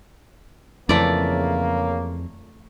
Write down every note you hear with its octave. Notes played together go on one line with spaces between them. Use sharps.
F2 C#3 E3 A3 A#3 D5